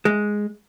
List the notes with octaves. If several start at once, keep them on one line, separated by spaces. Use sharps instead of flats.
G#3